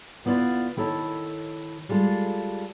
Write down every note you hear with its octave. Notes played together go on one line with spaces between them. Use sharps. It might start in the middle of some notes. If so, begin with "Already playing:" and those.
D2 B3 E4 F4 D5
D#3 E4 A4 C#5 A5
G3 G#3 F4 A4